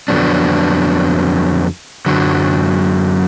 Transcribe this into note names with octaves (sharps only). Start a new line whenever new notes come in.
F2 D3 F#3 B3 D4
F#2 D3 F#3